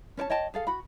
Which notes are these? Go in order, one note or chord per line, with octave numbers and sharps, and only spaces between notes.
C#4 C5 C#5 A5
C#5 D#5 G5 A5
G#4 A4 F5
F#4 B5